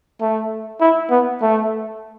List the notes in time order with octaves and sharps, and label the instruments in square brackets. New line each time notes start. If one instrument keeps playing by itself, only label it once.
[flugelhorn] A3
E4
B3
A3